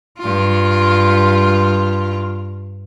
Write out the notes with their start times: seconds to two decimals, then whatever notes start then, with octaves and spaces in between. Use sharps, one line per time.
0.18 G2 F4